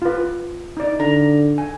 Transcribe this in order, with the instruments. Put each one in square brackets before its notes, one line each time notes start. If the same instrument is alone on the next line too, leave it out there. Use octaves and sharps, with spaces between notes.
[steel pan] F4 B4
D#4 D5
[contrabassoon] D3 [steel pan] A#5
[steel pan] G#5